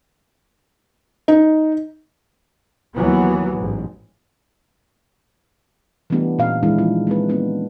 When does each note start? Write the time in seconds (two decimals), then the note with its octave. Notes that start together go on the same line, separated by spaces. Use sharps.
1.28 D#4
2.97 D#2 E3 F#3 B3
3.56 A1 G#2
6.10 E3 G3 A3 B3 D4 G4
6.39 A#2 B3 C#4 F5
6.63 D#3 E3 G#3 D4 E4
6.78 F3 D4 D#4 F4
7.07 G#3 A#3 C4 B4
7.29 A#3 B3 C#4 D4